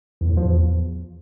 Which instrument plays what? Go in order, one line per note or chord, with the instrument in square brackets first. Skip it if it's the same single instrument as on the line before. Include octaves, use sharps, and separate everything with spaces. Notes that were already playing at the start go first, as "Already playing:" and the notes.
[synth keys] E2
A2
F3
E2